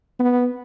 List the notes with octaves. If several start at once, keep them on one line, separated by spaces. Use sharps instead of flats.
B3